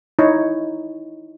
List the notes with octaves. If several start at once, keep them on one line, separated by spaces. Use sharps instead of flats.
D#4 E4 C#5